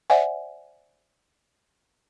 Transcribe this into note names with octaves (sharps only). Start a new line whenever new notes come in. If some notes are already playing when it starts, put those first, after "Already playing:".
C5 D5 E5 F#5 G#5